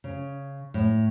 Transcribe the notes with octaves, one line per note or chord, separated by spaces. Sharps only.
C#3
A2